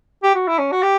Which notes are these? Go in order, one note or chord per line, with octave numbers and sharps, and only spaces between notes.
G4
F#4
E4
C#4
F#4
G4